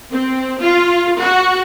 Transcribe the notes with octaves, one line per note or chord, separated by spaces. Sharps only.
C4
F4
F#4